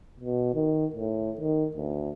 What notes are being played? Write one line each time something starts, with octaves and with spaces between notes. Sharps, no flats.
B2
D#3
A2
D#3
D2